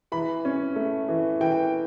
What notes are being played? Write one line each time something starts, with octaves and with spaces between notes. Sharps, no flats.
E3 B5
C#4
A3
E3
E3 G5